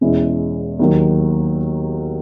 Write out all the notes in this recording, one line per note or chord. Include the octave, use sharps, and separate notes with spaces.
E2 B2 G#3 C#4 E4
D#2 D#3 F#3